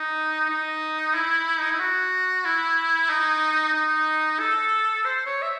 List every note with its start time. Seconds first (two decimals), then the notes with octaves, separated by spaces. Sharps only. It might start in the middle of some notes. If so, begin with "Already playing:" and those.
Already playing: D#4
0.50 D#4
1.14 E4
1.61 D#4
1.71 E4
1.79 F#4
2.45 E4
3.09 D#4
3.74 D#4
4.40 A4
5.05 C5
5.26 C#5
5.42 E5